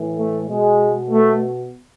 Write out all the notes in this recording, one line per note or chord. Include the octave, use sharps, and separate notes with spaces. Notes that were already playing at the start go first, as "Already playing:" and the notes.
Already playing: A2 E3
A3
B2 G#3
A3